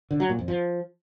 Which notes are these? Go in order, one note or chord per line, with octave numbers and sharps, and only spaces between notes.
D3
F#3
A#2
F2
F3